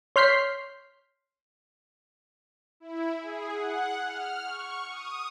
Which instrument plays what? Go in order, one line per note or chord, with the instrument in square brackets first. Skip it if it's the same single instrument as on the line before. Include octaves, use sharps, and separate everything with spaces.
[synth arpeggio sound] C#5 C6 F6 G6 B6 C7
[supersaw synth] E4
G#4
F#5
F6
C#6
D#6